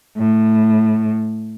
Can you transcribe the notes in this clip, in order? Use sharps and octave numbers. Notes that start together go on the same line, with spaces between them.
A2